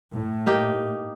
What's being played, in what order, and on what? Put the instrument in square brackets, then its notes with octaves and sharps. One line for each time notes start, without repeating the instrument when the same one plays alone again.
[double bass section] A2
[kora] A#3 D#4 G4